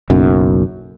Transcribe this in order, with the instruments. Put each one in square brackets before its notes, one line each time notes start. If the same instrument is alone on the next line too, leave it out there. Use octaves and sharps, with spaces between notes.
[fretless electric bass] F#1 B1 F#2